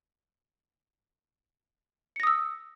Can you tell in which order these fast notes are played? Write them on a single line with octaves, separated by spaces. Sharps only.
C#7 A#6 D#6 E6